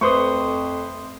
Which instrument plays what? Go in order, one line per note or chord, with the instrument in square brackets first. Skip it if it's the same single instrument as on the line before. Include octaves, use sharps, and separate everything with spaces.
[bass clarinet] F2 [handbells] A3 C6 D#6 [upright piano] B4 C5 C#6